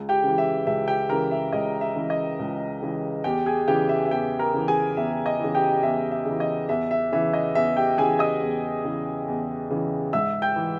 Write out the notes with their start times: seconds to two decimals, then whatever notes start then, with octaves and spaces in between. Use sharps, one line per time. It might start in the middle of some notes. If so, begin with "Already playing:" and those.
Already playing: C#2
0.09 G4 G5
0.23 C#3 E3
0.38 E5
0.67 C#2 E5
0.87 G4 G5
1.09 C#3 E3 A#4 A#5
1.31 E5
1.53 C#2 D#5
1.81 E5
1.96 C#3 E3
2.10 D#5
2.39 C#2
2.82 C#3 E3
3.24 E2 G4 G5
3.46 G#4 G#5
3.68 C#3 E3 G4 G5
3.89 E5
4.05 E5
4.11 E2 G4 G5
4.39 A#4 A#5
4.53 C#3 E3
4.68 G#4 G#5
4.97 E2 E5
5.26 D#5
5.40 C#3 E3
5.55 G4 G5
5.83 E2 E5
6.12 E5
6.25 C#3
6.31 E3
6.40 D#5
6.69 E2 E5
6.91 E5
7.12 C#3 E3 E5
7.33 D#5
7.55 E2 E5
7.77 G4 G5
7.98 C#3 E3 G#4 G#5
8.19 D#5 D#6
8.41 E2
8.84 C#3 E3
9.28 E2
9.70 C#3 E3
10.13 G#2 E5 E6
10.42 G5 G6
10.56 E3